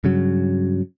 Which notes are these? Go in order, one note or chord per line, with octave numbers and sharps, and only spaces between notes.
G2 C#3 F#3